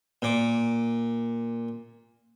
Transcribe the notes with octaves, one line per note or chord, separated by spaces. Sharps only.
A#2 D6